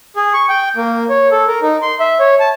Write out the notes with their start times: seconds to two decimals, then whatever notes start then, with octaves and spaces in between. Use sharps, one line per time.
0.16 G#4
0.34 C#6
0.49 G5
0.76 A#3
1.09 C#5
1.31 A4
1.47 A#4
1.62 D#4
1.82 C6
2.00 E5
2.19 C#5
2.40 A5